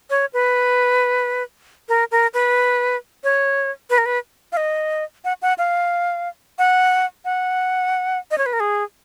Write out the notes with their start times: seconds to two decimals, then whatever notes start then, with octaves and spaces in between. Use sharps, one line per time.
0.10 C#5
0.34 B4
1.89 A#4
2.11 A#4
2.34 B4
3.24 C#5
3.90 B4
3.98 A#4
4.06 B4
4.52 F5
4.57 D#5
5.25 F#5
5.42 F#5
5.58 F5
6.59 F#5
7.25 F#5
8.31 D#5
8.38 C#5
8.46 B4
8.53 A#4
8.60 G#4